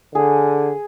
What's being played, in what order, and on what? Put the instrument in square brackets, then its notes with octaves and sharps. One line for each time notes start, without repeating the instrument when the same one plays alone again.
[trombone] D3 [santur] G#4